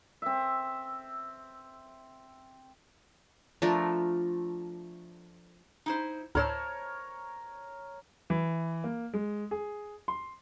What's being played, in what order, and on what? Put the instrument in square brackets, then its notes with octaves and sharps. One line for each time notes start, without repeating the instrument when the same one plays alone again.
[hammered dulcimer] C4 E5
[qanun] F3 A3 D4 A#4
[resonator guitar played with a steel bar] D#4 E4 C5
[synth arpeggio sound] D2 A2 E6 [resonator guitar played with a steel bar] E4 C5 A5 [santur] A#4 C#5
[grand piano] E3
A#3
G#3
G#4
C6